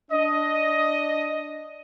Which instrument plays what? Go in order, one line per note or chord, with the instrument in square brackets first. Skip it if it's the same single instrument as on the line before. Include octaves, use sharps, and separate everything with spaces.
[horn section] D4 D#5